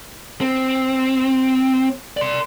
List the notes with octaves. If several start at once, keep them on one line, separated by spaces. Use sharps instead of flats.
C4
D5 C6